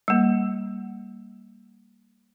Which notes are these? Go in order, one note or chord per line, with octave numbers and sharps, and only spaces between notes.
G3 A#3